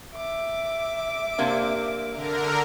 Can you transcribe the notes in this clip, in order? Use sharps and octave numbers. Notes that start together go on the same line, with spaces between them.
E5 D6
C3 A#3 D4
D3 A#4